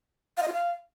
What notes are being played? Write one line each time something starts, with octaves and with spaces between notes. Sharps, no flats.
F5
D#5
F4
F5